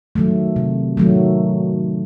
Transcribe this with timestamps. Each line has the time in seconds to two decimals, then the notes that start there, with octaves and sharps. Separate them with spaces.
0.15 D#3 F#3 A3
0.56 C3
0.97 D#3 F#3 A3